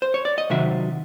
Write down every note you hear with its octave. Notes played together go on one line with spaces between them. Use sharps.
C5
C#5
D5
D#5
C3 D#3 F#3 C4 E5